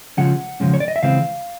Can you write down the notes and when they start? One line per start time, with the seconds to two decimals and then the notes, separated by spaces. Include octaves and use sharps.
0.17 C#3 F3 G#3 C#4 F#5
0.60 C#3 F3 G#3 C#4
0.74 C#5
0.80 D5
0.88 D#5
0.96 E5
1.03 C#3 E3 G#3 C4 F5